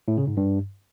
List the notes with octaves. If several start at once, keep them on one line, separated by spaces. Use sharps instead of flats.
A2
C#3
G#2
G2